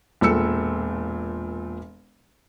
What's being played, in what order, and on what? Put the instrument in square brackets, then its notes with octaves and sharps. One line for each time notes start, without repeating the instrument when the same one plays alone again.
[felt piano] E1 A#2 A4 E6 C#7